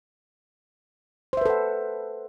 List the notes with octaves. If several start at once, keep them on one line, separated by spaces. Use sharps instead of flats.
A4 B4 C5 E5 F#5